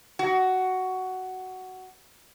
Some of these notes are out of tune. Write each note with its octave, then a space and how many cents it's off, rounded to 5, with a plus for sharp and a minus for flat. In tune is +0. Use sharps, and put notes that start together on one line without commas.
F#4 +10